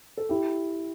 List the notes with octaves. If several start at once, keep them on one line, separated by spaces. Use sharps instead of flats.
A4
E4 G4